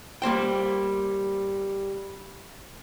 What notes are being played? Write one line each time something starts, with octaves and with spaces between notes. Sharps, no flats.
G3 A#3 C5 G5